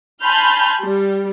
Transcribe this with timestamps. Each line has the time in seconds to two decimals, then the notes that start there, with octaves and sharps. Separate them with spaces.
0.22 G#5 A5 B5 C6 F6 G6
0.84 G3